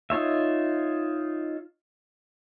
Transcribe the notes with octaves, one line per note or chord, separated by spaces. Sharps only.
D#4 F4 C#5 E5